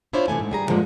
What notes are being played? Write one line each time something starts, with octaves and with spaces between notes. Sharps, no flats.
D4 E4 F4 C5 C#5
C3 E3 A3 G#5
G#2
G3 G#4 A#5
E2 G2 A#2 D3 F3 G#3